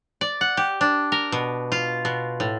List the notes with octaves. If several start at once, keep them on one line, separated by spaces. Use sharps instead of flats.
D5
F#5
G4
D4
A#4
B2
F4
B2
A2